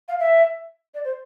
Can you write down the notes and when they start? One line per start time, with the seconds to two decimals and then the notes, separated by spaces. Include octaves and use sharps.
0.08 F5
0.19 E5
0.94 D5
1.04 C5